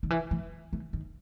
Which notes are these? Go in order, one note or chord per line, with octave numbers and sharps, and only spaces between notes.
D#3
E3
E3
E3
D#3